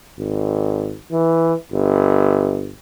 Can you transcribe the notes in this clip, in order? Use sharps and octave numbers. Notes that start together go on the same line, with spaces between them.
G#1
E3
G1